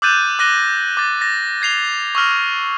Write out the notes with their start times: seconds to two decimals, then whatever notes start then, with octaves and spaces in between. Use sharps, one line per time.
0.02 D6 E6 F#6 G6 A6 D#7
0.39 D6 F#6 A#6 D#7 G7
0.97 D6 A6
1.21 A6 A#6
1.62 G#6 C7 F7 G7
2.15 C#6 E6 F6 A#6